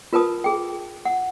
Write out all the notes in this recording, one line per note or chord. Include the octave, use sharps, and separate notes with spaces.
F4 A#4 B4 A5 D#6
G#4 G5
F#5